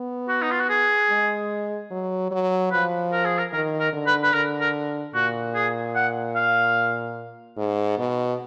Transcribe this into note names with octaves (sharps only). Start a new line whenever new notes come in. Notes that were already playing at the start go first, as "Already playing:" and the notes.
Already playing: B3
F#4
D#4
F4
F#4
G#4
G#3
F#3
F#3
F3 B4
A#4
G#4
A#4
D#3 A#4
A#4
D3
B4
B4
D3 A#4
A#4
A#2 F#4
G#4
F#5
F5
G#2
B2